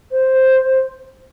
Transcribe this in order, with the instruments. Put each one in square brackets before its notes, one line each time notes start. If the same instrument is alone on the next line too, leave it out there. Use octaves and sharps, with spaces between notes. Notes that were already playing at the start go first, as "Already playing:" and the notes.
[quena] C5